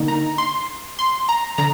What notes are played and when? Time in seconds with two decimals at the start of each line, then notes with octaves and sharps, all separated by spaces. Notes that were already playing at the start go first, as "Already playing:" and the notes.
Already playing: D3 A#3 D#4
0.08 A#5
0.38 C6
0.99 C6
1.29 A#5
1.58 D3 A#5